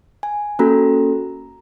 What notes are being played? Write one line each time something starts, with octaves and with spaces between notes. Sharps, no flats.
G#5
A#3 C#4 F#4 A4 A#5